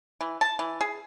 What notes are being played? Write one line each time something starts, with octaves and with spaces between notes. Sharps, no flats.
E3
A5
E3
G#4